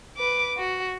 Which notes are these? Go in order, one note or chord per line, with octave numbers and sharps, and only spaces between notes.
B4 D6
F#4